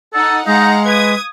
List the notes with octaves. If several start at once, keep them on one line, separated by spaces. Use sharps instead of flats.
D#4 A4 F#5
G#3 D#4 F5 F#5 A#5
B4 D#6 G#6